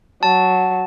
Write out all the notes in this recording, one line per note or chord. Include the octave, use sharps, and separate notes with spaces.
F#3 A5